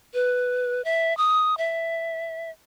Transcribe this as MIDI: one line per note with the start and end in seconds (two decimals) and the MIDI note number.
0.14 0.84 71
0.84 1.16 76
1.17 1.57 87
1.58 2.50 76